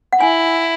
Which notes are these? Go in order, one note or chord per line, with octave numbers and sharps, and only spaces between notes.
F#5
E4 G#5